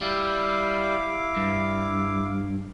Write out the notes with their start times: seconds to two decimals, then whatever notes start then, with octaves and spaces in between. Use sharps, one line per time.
0.01 G3 E4 F5 D6
1.37 G2